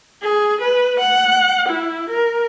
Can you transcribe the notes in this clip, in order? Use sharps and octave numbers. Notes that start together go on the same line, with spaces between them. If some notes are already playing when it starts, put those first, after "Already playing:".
G#4
B4
F#5
E4
A#4